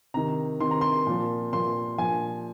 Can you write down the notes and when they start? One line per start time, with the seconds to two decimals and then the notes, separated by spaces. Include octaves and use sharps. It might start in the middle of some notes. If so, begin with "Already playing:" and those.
0.14 C3 D#3 A#5
0.60 C3 D#3 C6
0.71 A#5
0.81 C6
1.07 A#2 F3
1.53 A#2 F3 C6
1.98 A#2 F3 G#5